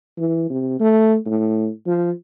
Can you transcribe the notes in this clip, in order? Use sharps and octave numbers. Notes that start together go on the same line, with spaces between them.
E3
C3
A3
A2
F3